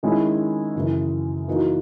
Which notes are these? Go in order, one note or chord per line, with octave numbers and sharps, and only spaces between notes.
D#3 G#3 C#4 E4
F#2 C#3 E3
E3 A#3 D#4 F#4